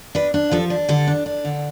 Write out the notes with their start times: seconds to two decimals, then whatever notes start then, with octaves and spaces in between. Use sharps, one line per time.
0.15 D4 B4
0.34 D4
0.51 F3 A4
0.70 D4
0.89 D3 A4
1.07 D4
1.26 D4
1.45 D3